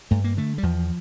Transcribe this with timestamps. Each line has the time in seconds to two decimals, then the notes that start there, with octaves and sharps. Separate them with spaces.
0.11 G2 A3
0.24 A#3
0.37 D3 A3
0.58 G3
0.63 E2 F3